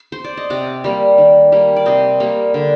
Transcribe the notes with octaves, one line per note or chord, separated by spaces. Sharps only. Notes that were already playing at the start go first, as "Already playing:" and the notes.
Already playing: A#4
C5
D5
D#5
C3 D5 F#5
G3 A#3
D#3
G3 A#3
D5
C3 C5 D#5
G3 A#3
D3